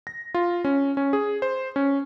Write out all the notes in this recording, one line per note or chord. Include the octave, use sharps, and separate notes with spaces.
A#6
F4
C#4
C#4
G#4
C5
C#4